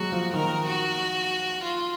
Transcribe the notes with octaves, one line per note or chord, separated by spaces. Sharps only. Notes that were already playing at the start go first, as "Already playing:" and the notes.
Already playing: F#3 G#3 F#4
F3
D#3 A#4
F#4
F4